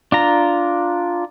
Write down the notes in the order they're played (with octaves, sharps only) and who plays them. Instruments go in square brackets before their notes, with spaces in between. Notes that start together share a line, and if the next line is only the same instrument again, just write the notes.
[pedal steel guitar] D4 F4 A#5